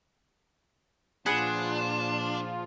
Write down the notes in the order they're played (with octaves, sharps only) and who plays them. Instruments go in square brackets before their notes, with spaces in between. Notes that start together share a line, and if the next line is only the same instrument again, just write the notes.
[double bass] A#2 [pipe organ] F3 F4 [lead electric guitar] D4 [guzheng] G#4 B4 F#5